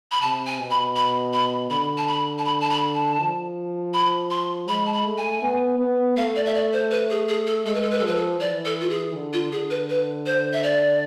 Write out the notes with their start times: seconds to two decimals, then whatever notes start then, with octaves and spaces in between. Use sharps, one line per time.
0.12 B5
0.22 C3 A5
0.46 G#5
0.59 B2
0.71 B5
0.96 B5
1.33 B5
1.70 D3 B5
1.98 A5
2.07 B5
2.38 A5
2.45 B5
2.61 A5
2.70 B5
2.95 A5
3.19 F3
3.94 B5
4.31 C6
4.68 G#3 B5
4.86 A5
4.93 B5
5.06 A3
5.18 G#5
5.42 B3
5.79 B3
6.17 A3 F5
6.36 D5
6.46 E5
6.54 D5
6.73 C5
6.91 B4
7.10 G#4
7.29 G#4
7.47 A4
7.66 G#3 A4
7.74 B4
7.82 A4
7.91 B4
7.98 A4
8.03 F3 B4
8.15 A4
8.40 E3 D5
8.65 A4
8.81 F4
8.90 G#4
9.15 D3
9.33 F4
9.52 D3 G#4
9.70 B4
9.90 B4
10.26 C5
10.53 E5
10.63 D5